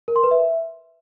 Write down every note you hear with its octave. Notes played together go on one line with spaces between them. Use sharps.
A#4
C6
B4
E5